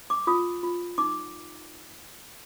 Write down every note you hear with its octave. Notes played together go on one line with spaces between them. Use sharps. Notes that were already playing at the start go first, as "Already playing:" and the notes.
D6
F4 D#6
F4
D#4 D6